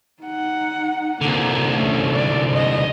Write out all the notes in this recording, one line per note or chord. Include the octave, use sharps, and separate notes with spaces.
D#4 F#5
C2 D3 A#3
A3 C#4
D5
D#5